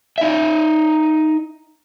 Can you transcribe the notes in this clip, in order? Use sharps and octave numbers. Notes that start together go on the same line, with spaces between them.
D#4 E5